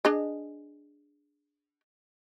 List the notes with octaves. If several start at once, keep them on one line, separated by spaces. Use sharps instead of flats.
D4 G#4 D#5